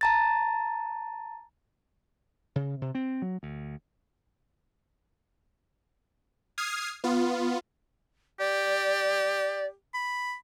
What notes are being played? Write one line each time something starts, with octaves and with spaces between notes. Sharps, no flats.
A5 A#5 A6
C#3
C3
C4
F#3
D2
D#6 F6 G#6 C7
B3 F4
G4 D5
B5